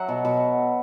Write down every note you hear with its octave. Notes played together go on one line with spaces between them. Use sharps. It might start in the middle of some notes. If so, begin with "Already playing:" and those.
Already playing: F#3 E5 F#5
B2
B2